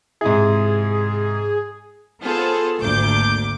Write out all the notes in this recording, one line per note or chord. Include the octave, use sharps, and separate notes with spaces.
G#2 C3 E4 G#4
B3 F4 G#4 A4 C5
G#1 D2 A#3 D6 G6